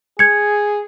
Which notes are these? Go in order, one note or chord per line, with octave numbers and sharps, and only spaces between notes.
G#4 G#6 C#7